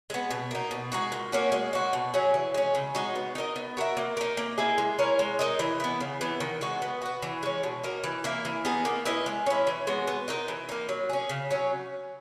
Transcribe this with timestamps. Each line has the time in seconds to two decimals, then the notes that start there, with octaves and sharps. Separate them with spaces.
0.10 G#3 B3
0.31 B2
0.51 A#3 D#4
0.71 B2
0.92 G#3 D#4 F#4
1.12 A#2
1.32 A#3 C#4 F#4
1.52 G#3
1.73 D#4 F#4
1.93 B2
2.14 F#3 C#4 G#4
2.34 E3
2.54 G#3 C#4
2.75 C#3
2.95 G#3 D#4 F#4
3.15 B3
3.35 D#4 A#4 D#5
3.56 B3
3.77 F#4 A#4 E5
3.97 A#3
4.17 D#4 A#4
4.37 A#3
4.58 E4 G#4 D#5
4.78 G#3
4.99 C#4 E4 A#4
5.19 G#3
5.39 D#4 A#4 D#5
5.59 E3
5.80 B3 E4
6.00 C#3
6.21 E3 B3
6.40 D#3
6.61 G#3 D#4 F#4
6.82 B3
7.02 F#4 B4
7.22 E3
7.43 G#3 C#4
7.63 B2
7.83 A#3 D#4 A#4
8.04 E3
8.24 A#3 E4 A#4
8.45 E3
8.65 B3 D#4 G#4
8.85 A#3
9.05 E4 B4 D#5
9.26 G#3
9.46 C#4 E4
9.67 E3
9.87 G#3 B3 F#4
10.07 B3
10.28 D#4 A#4 D#5
10.48 E3
10.69 A#3 D#4
10.89 F#3
11.09 C#4 G#4
11.29 C#3
11.51 F#3 C#4